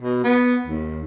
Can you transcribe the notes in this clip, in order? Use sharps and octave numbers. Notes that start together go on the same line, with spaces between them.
B2
B3
D#2